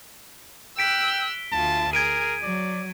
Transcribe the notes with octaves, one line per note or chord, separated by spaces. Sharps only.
G5 E6 F#6 B6 D7
G7
D2 F4 A5
G#4 A#4 G#6 D7 D#7
F#3 D5